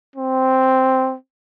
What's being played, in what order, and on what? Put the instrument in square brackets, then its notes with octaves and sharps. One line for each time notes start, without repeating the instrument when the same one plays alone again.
[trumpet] C4